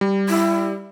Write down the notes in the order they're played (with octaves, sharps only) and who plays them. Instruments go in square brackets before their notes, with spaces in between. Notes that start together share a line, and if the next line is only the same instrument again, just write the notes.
[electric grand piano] G3
[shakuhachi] E4